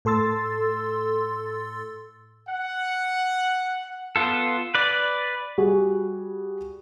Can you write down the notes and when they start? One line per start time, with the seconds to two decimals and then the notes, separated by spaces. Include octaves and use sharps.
0.05 A2 A4 C6 E6 A6
2.49 F#5
4.16 B3 F4 A4
4.75 B4 D5
5.58 G3 F#4 G#4